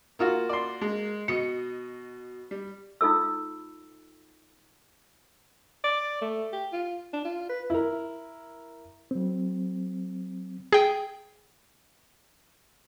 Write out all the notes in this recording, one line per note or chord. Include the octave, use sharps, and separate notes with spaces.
A#3 F4 F#4
D5 C6
G#3
B2 D#5 C#7
G3
D#4 F4 A4 E6
D5
A3
G4
F4
D4
F4
B4
E4 A#4
F#3 C4
G#4 G5